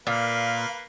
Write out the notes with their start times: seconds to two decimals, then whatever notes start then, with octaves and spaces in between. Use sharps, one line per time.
0.07 A#2 A#3 B4 F5